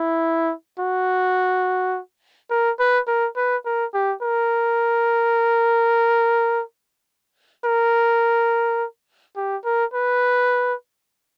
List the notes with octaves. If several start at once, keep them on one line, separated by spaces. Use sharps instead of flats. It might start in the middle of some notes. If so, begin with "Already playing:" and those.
Already playing: E4
F#4
A#4
B4
A#4
B4
A#4
G4
A#4
A#4
G4
A#4
B4